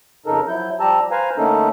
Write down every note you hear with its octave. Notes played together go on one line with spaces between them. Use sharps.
F2 C#3 D#4 A4 A#4
F3 F#3 E4 G6
F3 G3 G4 A5 A#5 E6
B4 C5 F5 G#5 A#5
D3 A3 A#3 C#4 D#4 A4